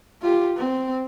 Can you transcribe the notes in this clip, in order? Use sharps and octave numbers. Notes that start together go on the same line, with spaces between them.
F4 G4
C4